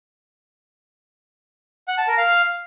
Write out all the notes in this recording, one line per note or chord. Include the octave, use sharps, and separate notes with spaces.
F#5
A5
A#4
F5